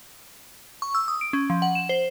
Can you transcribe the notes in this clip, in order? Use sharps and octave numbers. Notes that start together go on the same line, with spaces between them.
C#6
E6
D#6
D7
C#4
F3
F#5
E7
C5